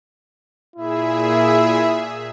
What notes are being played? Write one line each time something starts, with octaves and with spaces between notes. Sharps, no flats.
A#2 E4 G#4 E5